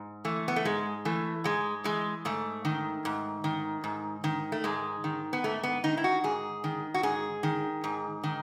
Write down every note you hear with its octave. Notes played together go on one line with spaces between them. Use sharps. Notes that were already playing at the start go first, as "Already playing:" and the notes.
Already playing: G#2
E3 A3
B3
A3
G#2 G#3
E3 A3
G#2 G#3
E3 G#3
G#2 A3
D#3
G#2
D#3
G#2
D#3
A3
G#2 G#3
D#3
B3
G#2 A3
B3
D#3 D#4
E4
F#4
G#2 G#4
D#3
F#4
G#2 G#4
D#3
G#2
D#3